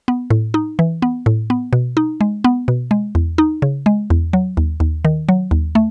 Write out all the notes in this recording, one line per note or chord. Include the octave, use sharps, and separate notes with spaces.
B3
A2
D#4
E3
B3
A2
B3
B2
D#4
G#3
B3
B2
G#3
E2
D#4
C#3
G#3
E2
F#3
D#2
D#2
D#3
F#3
D#2
A3